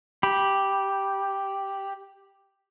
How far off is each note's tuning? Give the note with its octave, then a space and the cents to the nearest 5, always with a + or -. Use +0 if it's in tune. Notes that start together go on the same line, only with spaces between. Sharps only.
G4 +0 B5 -20